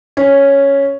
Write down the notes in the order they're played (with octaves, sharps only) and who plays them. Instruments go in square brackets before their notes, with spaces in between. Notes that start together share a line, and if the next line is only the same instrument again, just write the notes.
[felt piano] C#4